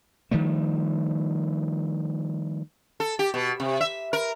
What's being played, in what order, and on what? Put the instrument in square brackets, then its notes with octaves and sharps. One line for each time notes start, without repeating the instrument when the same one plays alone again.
[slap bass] D#3 F3 G3 A3
[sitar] A4
G4
B2
C3
E5
A#4